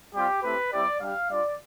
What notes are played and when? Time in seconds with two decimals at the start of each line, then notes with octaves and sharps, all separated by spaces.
0.14 G3 C4 F4 G4
0.43 A3 C4 E4 G4 B4
0.72 G3 C4 E4 G4 D5
1.00 G3 D4 G4 F5
1.29 G3 D4 F4 D5